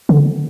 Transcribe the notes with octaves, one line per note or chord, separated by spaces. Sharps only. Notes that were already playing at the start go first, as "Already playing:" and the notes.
D3